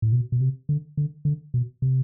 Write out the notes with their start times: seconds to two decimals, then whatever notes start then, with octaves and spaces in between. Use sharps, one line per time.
0.02 A2
0.12 B2
0.32 B2
0.41 C3
0.69 D3
0.97 D3
1.25 D3
1.54 B2
1.82 C3